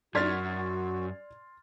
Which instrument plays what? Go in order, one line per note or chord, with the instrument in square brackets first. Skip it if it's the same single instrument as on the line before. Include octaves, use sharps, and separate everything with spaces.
[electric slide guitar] F#2 [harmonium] F#4 [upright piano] D5 G#6 B6 [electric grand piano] C6 F6 A6